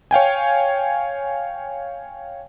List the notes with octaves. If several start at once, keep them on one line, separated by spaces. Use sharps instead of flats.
C#5 F5 G5 G#5